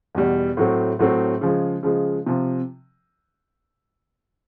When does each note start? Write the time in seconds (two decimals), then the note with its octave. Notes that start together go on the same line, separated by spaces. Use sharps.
0.15 E2 B2 G3
0.57 A2 F#3 A3 C4
0.99 A2 F#3 A3 C4
1.41 C#3 F3 G#3
1.83 C#3 F3 G#3
2.26 C3 F3